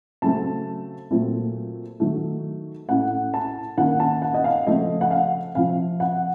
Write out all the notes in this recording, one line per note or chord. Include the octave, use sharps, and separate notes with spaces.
C#3 F#3 A3 C4 A5
A#2 F#3 A3 C4
D#3 F#3 A3
A2 A3 C#4 F#5
A5
D#3 A#3 C#4 F#5
A5
F#5
D#5
F5
C#3 F3 A3 C4 D#5
F#5
F5
C3 F3 C4 F5
F#5